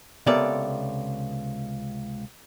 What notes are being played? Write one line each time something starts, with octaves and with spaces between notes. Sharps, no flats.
C#2 C3 B3 A4 A#4 D5